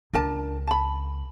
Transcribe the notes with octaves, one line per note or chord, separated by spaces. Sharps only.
C#2 D4 A#4 A5
A5 B5